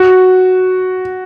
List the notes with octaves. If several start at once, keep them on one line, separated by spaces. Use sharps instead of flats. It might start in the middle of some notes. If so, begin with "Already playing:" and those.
Already playing: F#4